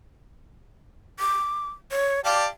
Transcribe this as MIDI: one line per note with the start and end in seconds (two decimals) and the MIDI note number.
1.20 1.68 86
1.92 2.20 73
2.25 2.46 67
2.25 2.46 74
2.25 2.46 77
2.25 2.46 81